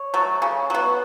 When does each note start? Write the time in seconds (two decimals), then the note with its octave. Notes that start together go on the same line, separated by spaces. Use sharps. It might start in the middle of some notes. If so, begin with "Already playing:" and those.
Already playing: C#5
0.14 F#3 A3
0.42 C#3
0.70 F#3 B3